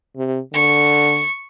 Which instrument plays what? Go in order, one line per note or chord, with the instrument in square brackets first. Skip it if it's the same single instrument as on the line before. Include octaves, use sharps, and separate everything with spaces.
[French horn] C3
[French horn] D3 [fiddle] C#6